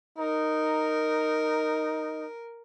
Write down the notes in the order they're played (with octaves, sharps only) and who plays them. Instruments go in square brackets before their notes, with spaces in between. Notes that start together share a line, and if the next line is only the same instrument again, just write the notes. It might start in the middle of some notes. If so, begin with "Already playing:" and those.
[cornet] D#4 [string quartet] A#4